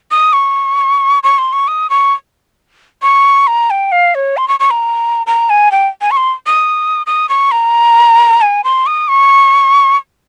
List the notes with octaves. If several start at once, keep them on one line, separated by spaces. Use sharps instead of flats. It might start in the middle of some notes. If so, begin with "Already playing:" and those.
D#6
C#6
C#6
C6
C#6
D#6
C#6
C#6
A#5
G5
F5
C#5
C6
C#6
C#6
A#5
A#5
G#5
G5
G#5
C#6
C6
D#6
D#6
C#6
A#5
G#5
C6
D#6
C#6